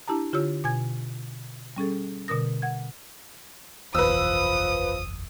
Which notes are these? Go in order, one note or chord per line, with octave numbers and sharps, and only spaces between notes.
D4 E4 G4 A5 A#5
D3 F4 G4 C#5 E6
B2 G#5 G#6
G3 C#4 G#4 A4
B2 D3 A#4 D#6 A#6
F#5 G#6
F#1 B1 E2 F3 B4 D#6 E6